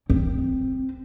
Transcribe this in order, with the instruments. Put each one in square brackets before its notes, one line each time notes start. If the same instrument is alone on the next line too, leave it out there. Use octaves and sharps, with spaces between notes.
[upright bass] C4